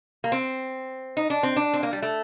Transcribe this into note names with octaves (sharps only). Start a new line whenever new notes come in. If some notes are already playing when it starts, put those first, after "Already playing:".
A#3
C4
D#4
D4
C4
D4
C4
A#3
G3
A3